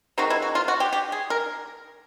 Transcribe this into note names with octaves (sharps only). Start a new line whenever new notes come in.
C3 D#3 G#3 F#4
E4
F#4
F4
F#4
G4
G4
G#4
A#4